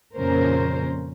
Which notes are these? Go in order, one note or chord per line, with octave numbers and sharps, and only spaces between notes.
F2 A#2 C#3 C#4 A#4 C5